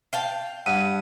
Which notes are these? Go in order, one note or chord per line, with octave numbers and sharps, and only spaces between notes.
F5 G5 A5
G2 F#5 D#7